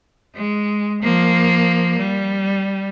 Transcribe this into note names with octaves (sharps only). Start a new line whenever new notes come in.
G#3
F3 A#3
G3